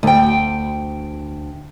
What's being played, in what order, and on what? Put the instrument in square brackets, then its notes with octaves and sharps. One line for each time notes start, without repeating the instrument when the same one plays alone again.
[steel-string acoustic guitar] D2 G5